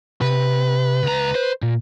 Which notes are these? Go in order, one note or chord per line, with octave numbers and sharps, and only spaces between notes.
C3 B4
C#2 A#5
C5
A#2